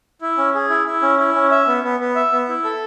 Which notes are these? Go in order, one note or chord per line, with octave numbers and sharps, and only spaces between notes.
E4
C#4
G#4
E4
E4
C#4
E4
C#4
E5
B3
B3
B3
E5
B3
E4
A4